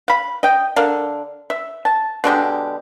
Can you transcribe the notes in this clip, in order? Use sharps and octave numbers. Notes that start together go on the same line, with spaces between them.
F5 B5
D#5 G5
D3 A#4 F5
E5
A5
B2 D3 G#3 G4